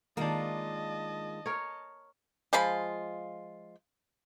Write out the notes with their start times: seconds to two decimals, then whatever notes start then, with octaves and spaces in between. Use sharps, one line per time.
0.17 D#3 G#3 A#3 D4 F4 D#5 A5
1.46 A#4 C#5
2.53 F3 G#3 F4 B5